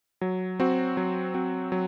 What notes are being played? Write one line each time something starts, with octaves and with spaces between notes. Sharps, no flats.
F#3
C4 F#4
F#3
C4 F#4
F#3